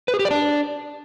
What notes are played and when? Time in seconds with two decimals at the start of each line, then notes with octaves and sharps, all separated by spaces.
0.08 B4
0.14 G#4
0.19 G4
0.25 D5
0.31 D4